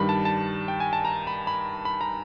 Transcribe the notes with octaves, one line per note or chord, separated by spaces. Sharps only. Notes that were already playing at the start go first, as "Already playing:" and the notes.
Already playing: G2 D#3 G3 B5
A5
A5
G5
G#5
A5
A#5
B5
B5
B5
A#5